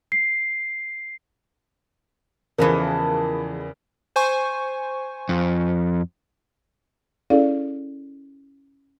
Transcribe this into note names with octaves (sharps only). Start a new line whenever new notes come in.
C7
E2 C#3 E3 F3 G#3 A4 A#4
C5 G#5 C#6
F2
C#4 E4 G#4 A4 D5 F5